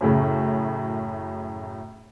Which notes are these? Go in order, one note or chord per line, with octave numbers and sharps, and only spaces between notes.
F#2 A2 C#3